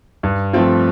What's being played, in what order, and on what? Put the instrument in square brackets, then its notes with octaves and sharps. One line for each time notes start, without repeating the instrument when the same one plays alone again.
[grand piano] G2
F3 A3 C4 F4